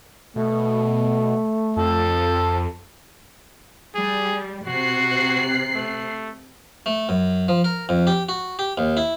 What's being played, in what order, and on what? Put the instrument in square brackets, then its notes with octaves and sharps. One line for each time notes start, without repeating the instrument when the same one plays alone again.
[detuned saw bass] B2 [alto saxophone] A3
[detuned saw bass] F2 [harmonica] F3 A4
[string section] G3 [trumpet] G#4
[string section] C3 F#6 C7 [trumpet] F#4
[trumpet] A3
[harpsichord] A3
F#2
F3
A#4
F2
G4
F#4
G4
D#2
E4